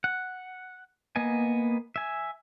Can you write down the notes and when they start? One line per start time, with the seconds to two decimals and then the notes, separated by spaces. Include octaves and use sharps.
0.04 F#5
1.16 A#3 B3 D#5 G#5
1.96 E5 G#5